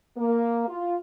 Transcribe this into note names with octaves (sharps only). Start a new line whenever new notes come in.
A#3
F4